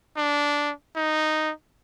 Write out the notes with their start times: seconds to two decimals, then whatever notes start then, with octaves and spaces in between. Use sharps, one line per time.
0.17 D4
0.96 D#4